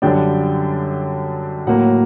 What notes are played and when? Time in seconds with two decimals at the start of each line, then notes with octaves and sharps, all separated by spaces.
0.02 F#2 D3 G3 D4 G5
1.67 A2 F#3 A#3 F#5